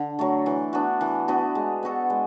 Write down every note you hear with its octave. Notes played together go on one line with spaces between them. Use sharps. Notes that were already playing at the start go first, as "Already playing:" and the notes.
Already playing: D3
F#3 A3
E3
B3 D4 F#4
E3
B3 D4 F#4
G#3
B3 F#4 A4
G#3